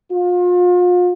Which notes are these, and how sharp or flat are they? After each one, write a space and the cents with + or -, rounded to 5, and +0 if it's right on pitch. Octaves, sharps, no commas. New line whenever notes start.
F4 +35